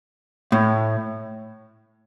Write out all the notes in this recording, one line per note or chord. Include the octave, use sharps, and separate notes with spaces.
A2